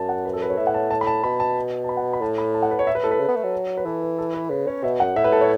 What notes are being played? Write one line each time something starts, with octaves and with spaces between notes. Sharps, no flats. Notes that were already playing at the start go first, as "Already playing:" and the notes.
Already playing: F#2 A5
F#5
B4
A4
B4
C#5
A2 E5
F#5
A5
A5
B5
A5
B2 B5
A5
A5
B5
F#5
B5
A2 A5
B5
A5
F#5
B4
C#5
E5
B4
A2 A4
B4
C#3
B3
A3
F#3
B4
E3 A4
B4
A4
B4
C#3 B4
C#4 C#5
B2 E5
F#2 F#5
A2 E5
B4
A4
C#5